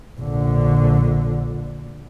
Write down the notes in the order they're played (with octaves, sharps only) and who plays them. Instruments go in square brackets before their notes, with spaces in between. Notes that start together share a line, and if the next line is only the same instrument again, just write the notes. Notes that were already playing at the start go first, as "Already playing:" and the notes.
[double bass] A#1 D3